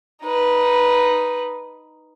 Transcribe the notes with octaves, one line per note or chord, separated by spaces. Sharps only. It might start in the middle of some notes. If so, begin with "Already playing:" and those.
D#4 B4